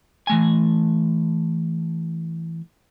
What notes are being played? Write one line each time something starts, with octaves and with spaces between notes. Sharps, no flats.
E3 A3 G#5